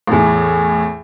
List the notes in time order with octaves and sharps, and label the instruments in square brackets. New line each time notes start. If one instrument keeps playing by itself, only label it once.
[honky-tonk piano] E2 A2